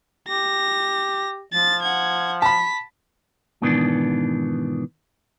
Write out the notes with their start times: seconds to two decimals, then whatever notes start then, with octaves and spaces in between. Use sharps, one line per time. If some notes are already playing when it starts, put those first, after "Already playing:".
0.28 G4 A#6
1.53 F3 A6
1.83 F#5 G#6
2.42 A5 B5 B6
3.62 G#2 B2 D#3 E3 B3 D4